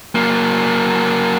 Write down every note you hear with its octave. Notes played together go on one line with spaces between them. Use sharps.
F#3 A#3